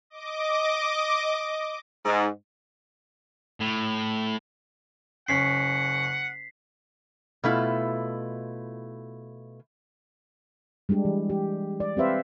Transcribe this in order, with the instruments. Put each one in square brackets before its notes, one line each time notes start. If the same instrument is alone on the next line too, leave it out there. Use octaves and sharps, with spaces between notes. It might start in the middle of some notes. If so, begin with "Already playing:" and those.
[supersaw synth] D#5 D6
[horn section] G#2
[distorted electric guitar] A2
[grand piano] F#1 C#4 [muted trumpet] F#5 [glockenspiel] B6 C7
[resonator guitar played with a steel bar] B2 A3 E4 F4
[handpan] G3 G#3 D4 G4
E3
G4
D5
C4 G4 B4 C5 E5 F5